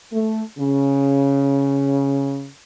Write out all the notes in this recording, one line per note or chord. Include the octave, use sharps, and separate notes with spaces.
A3
C#3